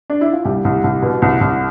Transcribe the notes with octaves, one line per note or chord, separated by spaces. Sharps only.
D4
E4
F4
C2 G3 G4
C2
C2
B2
C2
C2